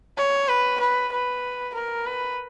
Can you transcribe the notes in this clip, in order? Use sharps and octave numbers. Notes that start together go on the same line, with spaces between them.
C#5
B4
B4
B4
A#4
B4